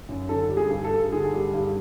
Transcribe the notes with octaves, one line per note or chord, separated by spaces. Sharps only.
F#2
D3 A4
G3
G#4
G2
A4
G2
D3 G#4
G3
G2